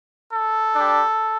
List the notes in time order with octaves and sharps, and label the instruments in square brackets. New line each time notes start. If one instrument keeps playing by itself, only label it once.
[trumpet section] A4
G3 D4 G4